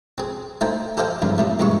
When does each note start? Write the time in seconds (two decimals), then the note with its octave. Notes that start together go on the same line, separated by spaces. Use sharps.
0.18 C4 G#4
0.61 A3 D#4 C5 G5
0.97 G4 A4 C5 D#5 F5 G5
1.22 E2 G2 C#3
1.38 A2 C3 A3
1.59 E2 G2 A#2 G#3 C#6